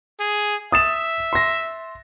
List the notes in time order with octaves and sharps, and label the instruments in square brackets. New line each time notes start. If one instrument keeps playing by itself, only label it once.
[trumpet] G#4
[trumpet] E5 [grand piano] D#6 A6 E7
[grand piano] C6 A#6